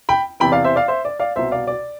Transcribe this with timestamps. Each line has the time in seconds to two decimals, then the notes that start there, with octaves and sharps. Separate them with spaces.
0.09 G5 B5
0.40 E2 C3 E3 G5 B5
0.52 D5 F5
0.64 C5 E5
0.76 D5 F5
0.88 C5 E5
1.05 D5
1.20 D5 F5
1.36 C2 B2 C5 E5
1.52 D5 F5
1.67 D5